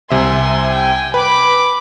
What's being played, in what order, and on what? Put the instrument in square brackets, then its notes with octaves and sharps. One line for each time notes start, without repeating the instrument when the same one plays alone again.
[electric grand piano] C2 C3 E5 [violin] G#5 C6
[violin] G5 G#5
[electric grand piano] B4 [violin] B5 D6